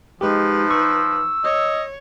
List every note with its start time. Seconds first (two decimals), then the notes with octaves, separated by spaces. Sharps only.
0.21 F3 G#3 D#4 G4 B4
0.71 C#6 E6
1.44 C#5 D#5